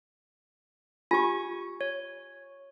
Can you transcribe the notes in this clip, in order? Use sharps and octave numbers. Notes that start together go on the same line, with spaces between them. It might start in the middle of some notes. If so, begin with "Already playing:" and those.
F4 G4 G#5 C#6
C#5